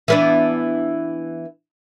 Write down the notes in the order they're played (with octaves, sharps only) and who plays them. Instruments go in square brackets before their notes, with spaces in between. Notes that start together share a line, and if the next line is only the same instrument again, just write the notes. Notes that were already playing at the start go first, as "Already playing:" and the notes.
[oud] E3 B3 D4